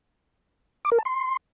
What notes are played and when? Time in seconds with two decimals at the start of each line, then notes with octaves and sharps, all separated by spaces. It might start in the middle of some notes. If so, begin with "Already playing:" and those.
0.85 D6
0.92 A#4
0.98 A5
1.05 C6